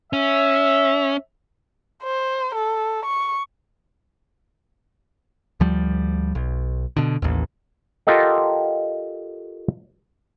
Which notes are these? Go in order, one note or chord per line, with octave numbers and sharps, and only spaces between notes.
C#4 E5
C5
A4
C#6
D2 F3 G3
B1
B2 D3
A1 D#2
F4 G4 A4 A#4 D#5 F#5